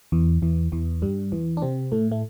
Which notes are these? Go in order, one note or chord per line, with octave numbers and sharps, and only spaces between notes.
E2 E3
E2 E3
E2 E3
G2 G3
E2 E3
D4
C3 C4
A2 A3
A3